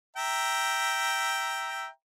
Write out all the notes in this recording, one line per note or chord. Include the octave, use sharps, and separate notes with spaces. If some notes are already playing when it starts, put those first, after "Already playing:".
E5 G5 A#5